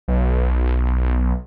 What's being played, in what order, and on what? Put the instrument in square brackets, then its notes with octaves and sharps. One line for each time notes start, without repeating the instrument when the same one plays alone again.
[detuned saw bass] B1